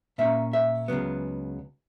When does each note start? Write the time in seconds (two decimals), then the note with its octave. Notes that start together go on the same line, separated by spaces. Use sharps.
0.18 A#2 A#3 C#4 E5
0.53 E5
0.88 C#2 C#3 F#3 B3